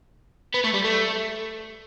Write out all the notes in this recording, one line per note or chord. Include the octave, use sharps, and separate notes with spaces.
B3
A3
G3
A3